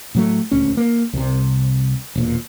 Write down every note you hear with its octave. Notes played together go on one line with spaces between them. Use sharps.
A2 F#3 A3
D#1 D2 C#4
A#3
C2 C3
E1 A#2